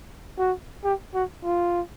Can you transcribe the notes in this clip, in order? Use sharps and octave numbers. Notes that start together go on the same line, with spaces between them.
F#4
G4
F#4
F4